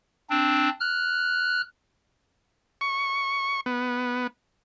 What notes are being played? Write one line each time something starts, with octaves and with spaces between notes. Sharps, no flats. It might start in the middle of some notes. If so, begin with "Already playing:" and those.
C4 D4
F6 F#6
C#6
B3